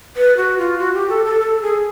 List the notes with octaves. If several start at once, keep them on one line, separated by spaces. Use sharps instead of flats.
B4
F#4
F4
F#4
G4
A4
A4
A4
A4
G#4